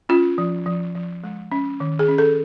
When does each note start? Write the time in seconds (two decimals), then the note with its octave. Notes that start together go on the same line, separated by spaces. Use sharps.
0.09 C#4 F4
0.38 F3
0.66 F3
0.95 F3
1.24 G#3
1.52 C#4
1.80 D#3
1.99 G#4
2.08 C#4
2.18 A4